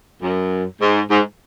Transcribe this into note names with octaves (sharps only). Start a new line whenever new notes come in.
F#2
G#2
G#2